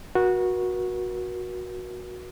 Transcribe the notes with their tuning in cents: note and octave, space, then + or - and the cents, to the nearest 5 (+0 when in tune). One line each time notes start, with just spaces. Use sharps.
F#4 -10 A#4 +45